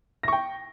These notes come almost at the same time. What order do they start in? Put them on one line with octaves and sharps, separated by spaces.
A#6 C#6 G5